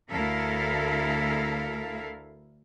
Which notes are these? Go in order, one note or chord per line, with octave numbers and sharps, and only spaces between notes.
D2 E4 A4 A#4 F5